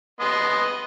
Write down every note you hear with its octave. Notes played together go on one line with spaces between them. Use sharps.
B3 D#5 C6